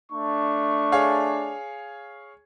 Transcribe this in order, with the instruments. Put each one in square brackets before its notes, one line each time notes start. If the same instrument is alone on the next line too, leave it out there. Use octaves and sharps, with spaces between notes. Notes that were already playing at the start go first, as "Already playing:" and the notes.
[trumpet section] A3 D4 C#6
[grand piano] G#4 C#5 F5